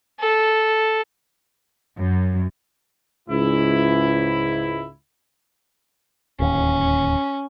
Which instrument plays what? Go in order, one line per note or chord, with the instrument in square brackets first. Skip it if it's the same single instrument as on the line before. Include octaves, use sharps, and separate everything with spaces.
[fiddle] A4
[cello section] F#2
[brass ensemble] C#2 G#2 E4
[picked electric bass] D1 D#2 [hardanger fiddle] C#4